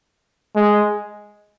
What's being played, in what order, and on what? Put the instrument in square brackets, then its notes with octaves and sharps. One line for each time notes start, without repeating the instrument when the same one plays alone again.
[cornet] G#3